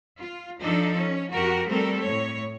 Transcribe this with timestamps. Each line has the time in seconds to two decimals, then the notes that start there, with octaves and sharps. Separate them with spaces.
0.20 F4
0.59 F3 D4 D#4 A4
0.96 C#4
1.32 F2 F#4 G4 A#4
1.68 G3 A3 C4 A4 A#4
2.03 A2 C#5